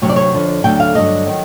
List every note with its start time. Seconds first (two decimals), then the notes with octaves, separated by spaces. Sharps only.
0.02 D2 C3 F#3 C#5
0.09 D5
0.16 C#5
0.33 F2 D3 F3
0.64 D2 D3 F#3 G5
0.80 F5
0.95 G2 D3 F#3 D#5
1.26 D#3 F#3